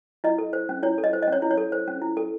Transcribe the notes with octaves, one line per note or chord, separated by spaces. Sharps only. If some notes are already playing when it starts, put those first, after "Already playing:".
E4 D#5
A4
C5
C#4
E4 C#5
A4
D#5
C5
D#5
C#4 C#5
E4
C#5
A4
C5
C#4
E4
A4